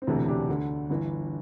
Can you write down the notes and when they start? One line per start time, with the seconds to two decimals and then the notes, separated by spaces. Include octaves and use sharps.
0.02 C4
0.07 E1 D2 C3 E3 A3
0.28 D4 G4
0.48 D2 D3
0.90 G1 G2 E3